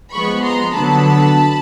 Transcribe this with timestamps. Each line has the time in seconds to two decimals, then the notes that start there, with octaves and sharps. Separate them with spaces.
0.13 F3 G#3 B3 B5 C#6
0.43 A#5 C6
0.73 D3 F#3 B3 A5 B5